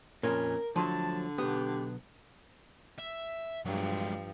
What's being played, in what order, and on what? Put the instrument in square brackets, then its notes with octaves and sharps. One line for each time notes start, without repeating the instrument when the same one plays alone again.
[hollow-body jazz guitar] F2 A#2 [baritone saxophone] C#4 [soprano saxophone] A#4
[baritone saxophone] D3 [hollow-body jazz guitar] F3 F#3 A3 [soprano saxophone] A5
[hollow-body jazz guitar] B1 B3 [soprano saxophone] G4
[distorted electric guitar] E5
[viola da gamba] G2 F3 [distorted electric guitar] F#3 G#3